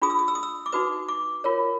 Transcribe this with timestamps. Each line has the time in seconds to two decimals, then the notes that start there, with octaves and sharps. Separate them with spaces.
0.02 D4 F4 G#4 D#6
0.10 E6
0.19 D#6
0.28 E6
0.35 D#6
0.43 E6
0.66 D6
0.72 D#4 F#4 B4 D#6
1.09 D6
1.44 F4 A#4 C#5